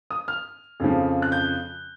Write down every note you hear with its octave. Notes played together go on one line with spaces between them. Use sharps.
D#6
F6
F2 C#3 F3
F#6
G6